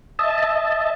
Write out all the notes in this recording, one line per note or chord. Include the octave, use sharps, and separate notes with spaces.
D#5 E5 A5